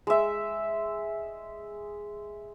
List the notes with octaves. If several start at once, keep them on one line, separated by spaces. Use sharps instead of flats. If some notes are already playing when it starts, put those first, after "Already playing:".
G#3 E5